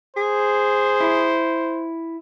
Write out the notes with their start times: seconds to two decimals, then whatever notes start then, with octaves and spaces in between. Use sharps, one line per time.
0.17 G#4 C5
1.00 E4